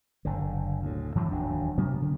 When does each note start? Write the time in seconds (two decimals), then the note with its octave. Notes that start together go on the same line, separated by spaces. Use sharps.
0.25 F#1 D3
0.82 D2 A2
1.15 G#2 E3 F#3
1.31 E1 D#2 F#3 D4
1.78 C3 F#3 A#3 B3
2.02 C#3